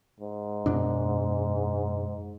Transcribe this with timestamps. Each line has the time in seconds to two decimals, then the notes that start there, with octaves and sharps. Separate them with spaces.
0.20 G#2
0.66 F#2 B2 D4